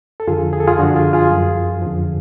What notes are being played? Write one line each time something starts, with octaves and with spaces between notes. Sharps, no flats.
A4
F2 D3 F3 F4 G#4
G#4
A4
F4 G#4
F#2 D3 F3 D4 F#4
F4 G#4
F4 G#4
F#2 F3
F2 D3 F3